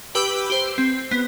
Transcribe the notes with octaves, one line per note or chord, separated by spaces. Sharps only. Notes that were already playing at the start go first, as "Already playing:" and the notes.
G4 B4 G5 B5 D6 E6
G4 C5
C4
B3